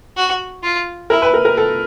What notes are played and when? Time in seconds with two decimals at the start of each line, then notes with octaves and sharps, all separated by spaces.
0.17 F#4
0.63 F4
1.10 E4 A#4
1.22 B4
1.34 A#4
1.45 A#4
1.57 A4